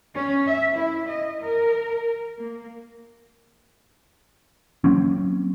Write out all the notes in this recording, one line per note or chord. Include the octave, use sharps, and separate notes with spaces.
C#4
E5
E4
D#5
A#4
A#3
F#3 A#3 C4 C#4